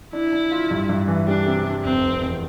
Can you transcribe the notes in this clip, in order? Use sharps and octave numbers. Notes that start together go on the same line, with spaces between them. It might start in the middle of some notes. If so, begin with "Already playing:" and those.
D4 E4
D4
F4
G2
G2
E3
G3 D4
C3
G3
F1 C4
F1
E2